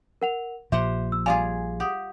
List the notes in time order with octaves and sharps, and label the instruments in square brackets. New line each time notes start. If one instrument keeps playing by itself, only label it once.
[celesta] A#4 F#5 F7
[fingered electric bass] A#1 A#2 F3 [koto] G4 C5 F#5 [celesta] E5 [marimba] C6
[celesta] E6
[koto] G3 F4 G#4 [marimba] F5 [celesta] G#5
[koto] G4 [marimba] F#5 D#6